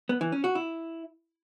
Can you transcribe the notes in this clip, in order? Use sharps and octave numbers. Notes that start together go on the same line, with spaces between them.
B3
E3
C#4
F#4
E4